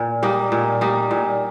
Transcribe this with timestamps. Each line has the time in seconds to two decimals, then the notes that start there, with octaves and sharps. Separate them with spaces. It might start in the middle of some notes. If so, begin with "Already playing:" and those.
Already playing: A#2
0.23 G3 A#3 D#4
0.52 A#2
0.81 G3 A#3 D#4
1.11 A#2